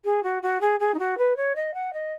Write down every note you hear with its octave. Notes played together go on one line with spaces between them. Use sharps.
G#4
F#4
F#4
G#4
G#4
D#4
F#4
B4
C#5
D#5
F#5
D#5